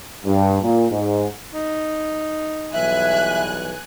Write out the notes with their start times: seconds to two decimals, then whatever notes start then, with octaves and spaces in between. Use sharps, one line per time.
0.25 G2
0.62 A#2
0.90 G#2
1.54 D#4
2.73 B1 E3 G3 E5 G#5 F#6